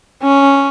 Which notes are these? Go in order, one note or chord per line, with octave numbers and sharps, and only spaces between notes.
C#4